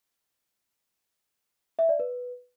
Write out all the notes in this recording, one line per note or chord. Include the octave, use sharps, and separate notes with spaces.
E5
D5
B4